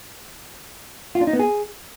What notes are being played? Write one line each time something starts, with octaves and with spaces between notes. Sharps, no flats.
F4
D4
D#4
B3
G#4